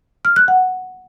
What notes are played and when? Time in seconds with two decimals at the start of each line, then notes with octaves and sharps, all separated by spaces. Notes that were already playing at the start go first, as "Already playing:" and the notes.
0.25 F6
0.36 F#6
0.48 F#5